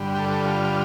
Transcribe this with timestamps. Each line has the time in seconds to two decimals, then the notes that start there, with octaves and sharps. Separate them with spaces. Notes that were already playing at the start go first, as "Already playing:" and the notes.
Already playing: G2 D3 G3
0.14 G4
0.19 A4
0.44 F4